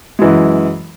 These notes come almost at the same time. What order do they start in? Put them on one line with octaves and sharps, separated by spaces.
G#3 E3 F#2